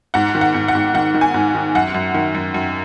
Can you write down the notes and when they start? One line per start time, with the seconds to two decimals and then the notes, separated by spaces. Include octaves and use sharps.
0.14 G#2 F#5
0.35 D#3
0.41 F#5
0.54 G#2
0.68 F#5
0.75 G#2
0.94 D#3 F#5
1.14 D#3
1.21 G#5
1.34 G#2
1.55 D#3
1.75 F#2 F#5
1.94 F#2
2.14 D#3
2.35 F#2
2.54 F#2